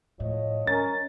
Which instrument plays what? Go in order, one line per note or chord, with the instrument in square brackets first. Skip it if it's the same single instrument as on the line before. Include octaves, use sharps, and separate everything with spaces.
[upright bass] A2 [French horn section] F3 C#5 D#5
[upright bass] G3 [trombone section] C#4 A#4 [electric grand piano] A6